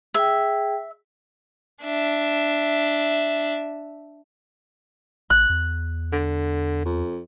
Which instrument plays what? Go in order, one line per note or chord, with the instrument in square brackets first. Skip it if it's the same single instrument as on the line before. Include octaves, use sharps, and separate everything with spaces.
[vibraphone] G#4 G5 [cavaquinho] E5
[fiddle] D4 E5
[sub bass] A1 [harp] F#6
[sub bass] E2
[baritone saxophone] D3
F2